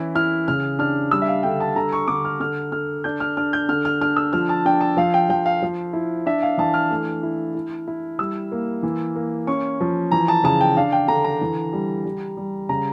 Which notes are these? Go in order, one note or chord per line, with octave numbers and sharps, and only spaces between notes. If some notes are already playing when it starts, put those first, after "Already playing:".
Already playing: E3 C#4 E4
E4 F6
C#3 F6
D4 F6
G3 E6
E5
F5
D3 G5
A5
D3 A#5
C#6
D3 D6
F6
D3 F6
D3 F6
D4 G6
F6
D4 F6
G6
D3 F6
F6
D4 F6
E6
F3 F6
A5
D4 G5
A5
F3 F5
G5
F3 G5
F5
F3
E4
D4 E5
F5
E3 A5
F6
A3
E4
E4
E4
G3 E6
A#3
E3
A#3
C#4 C#6
F3
E3 A#5
A5
C#3 A5
G5
D4 F5
G5
D3 A#5
A#5
E3
G3
G3
G3
C#3 A#5